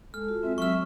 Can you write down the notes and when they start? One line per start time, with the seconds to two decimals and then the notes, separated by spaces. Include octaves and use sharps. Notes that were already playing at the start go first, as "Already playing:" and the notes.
0.14 G#3 A4 F6
0.28 F4 F#4
0.43 G#3 C4 E5
0.58 F#3 E5 C#6 F6